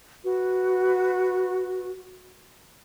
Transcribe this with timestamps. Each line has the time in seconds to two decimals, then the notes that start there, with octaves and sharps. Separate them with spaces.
0.24 F#4 B4